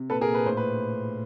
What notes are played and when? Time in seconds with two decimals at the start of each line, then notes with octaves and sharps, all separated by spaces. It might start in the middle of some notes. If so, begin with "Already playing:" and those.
Already playing: C3
0.10 A#2 A4 B4
0.21 G#4 A#4
0.28 A#2
0.34 B4
0.45 A2 C5
0.57 B4